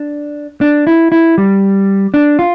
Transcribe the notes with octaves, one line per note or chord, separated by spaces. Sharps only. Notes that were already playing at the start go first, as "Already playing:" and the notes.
Already playing: D4
D4
E4
E4
G3
D4
F4